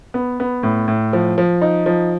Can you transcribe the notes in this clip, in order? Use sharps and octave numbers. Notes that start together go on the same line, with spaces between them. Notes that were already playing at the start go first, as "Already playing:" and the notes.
B3
B3
A2
A2
F3
F3
D#4
F3